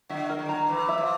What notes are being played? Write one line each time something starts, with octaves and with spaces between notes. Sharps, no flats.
D3 E5
A#4
D3
A#5
E3 A#4
E5
F3